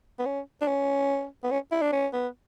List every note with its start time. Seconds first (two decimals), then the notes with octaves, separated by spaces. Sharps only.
0.19 B3
0.26 C#4
0.62 D4
0.68 C#4
1.44 B3
1.51 C#4
1.72 E4
1.82 D4
1.92 C#4
2.13 B3